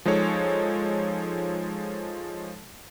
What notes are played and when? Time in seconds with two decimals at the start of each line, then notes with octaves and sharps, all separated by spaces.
0.05 F3 G#3 D#4 A4 C#5